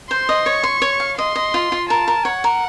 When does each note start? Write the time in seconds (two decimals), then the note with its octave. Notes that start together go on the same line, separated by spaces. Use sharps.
0.10 C5 C6
0.29 D#5
0.46 C#5 C#6
0.64 C6
0.82 C#5
1.00 F5
1.18 D#5 C6
1.36 D#5
1.54 F4
1.72 F4
1.90 A#4 A5
2.08 A#4
2.25 C#5 F#5
2.44 A#4